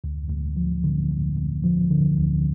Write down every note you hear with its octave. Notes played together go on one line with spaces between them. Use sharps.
D2
D2
F3
D3
D2
D2
F3
D3
D2